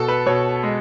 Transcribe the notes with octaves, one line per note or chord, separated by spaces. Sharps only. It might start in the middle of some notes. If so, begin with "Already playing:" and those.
Already playing: B2 A4
B4
B2 C#5
G#3